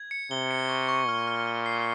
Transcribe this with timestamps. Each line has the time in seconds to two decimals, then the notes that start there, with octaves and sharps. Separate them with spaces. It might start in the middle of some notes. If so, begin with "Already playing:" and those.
Already playing: G#6
0.11 C#7
0.31 C3 G7
0.51 C#7
0.69 C#6
0.89 C#6
1.07 A#2 F6
1.27 F6
1.47 F6
1.66 C7